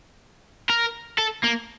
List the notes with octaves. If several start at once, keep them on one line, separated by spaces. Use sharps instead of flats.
A#4
A4
A#3